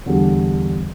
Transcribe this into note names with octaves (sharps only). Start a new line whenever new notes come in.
E2 D3 G3